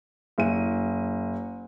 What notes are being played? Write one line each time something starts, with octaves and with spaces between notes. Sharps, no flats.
F#1 D#7